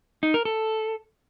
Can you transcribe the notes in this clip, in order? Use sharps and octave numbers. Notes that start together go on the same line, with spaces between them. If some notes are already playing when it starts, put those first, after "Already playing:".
D#4
A#4
A4